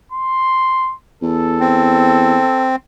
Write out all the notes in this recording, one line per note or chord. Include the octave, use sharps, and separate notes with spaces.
C6
E2 A4
C4